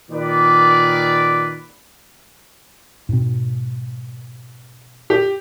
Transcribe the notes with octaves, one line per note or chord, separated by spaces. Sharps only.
A#2 D#3 B4 D5
G#2 B2 C4
G4